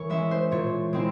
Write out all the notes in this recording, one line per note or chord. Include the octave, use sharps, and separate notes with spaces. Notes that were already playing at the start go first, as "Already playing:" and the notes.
Already playing: E3 A#4 C#5
G#3 C#4 E5
C5
A#2 C#5
G#3 C4 E4